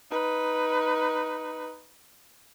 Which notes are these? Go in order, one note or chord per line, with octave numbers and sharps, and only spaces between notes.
D#4 B4